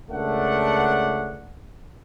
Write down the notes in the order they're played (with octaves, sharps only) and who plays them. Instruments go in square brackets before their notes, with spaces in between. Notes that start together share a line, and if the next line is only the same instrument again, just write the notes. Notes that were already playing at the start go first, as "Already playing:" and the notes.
[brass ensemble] C#2 A3 D4 A#4 F#5